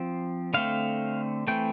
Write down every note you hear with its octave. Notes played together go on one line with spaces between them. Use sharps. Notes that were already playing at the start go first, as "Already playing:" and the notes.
Already playing: F3 C4
D3 A3 C4 F5
E3 A3 C4 G5